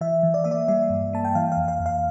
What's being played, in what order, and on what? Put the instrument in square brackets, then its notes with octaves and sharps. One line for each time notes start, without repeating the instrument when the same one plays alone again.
[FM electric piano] E3 E5
E3
D5
A#3 E5
D5
G3 E5
G2
A#3 A5
G5
E3 F5
F5
F2
F5
F2
F5